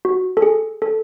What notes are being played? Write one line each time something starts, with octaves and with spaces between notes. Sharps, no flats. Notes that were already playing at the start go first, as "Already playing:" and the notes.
F#4
A4
G#4
A4